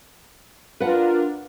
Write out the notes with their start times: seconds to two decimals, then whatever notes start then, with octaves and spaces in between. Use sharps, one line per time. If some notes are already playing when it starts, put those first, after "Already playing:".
0.80 D4 F4 A#4 B4 F#5